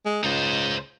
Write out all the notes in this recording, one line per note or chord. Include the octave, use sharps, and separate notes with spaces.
G#3
C#2 D#4 C5